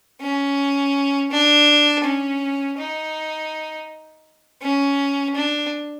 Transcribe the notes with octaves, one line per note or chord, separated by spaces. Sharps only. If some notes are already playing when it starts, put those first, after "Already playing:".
C#4
D4
C#4
D#4
C#4
D4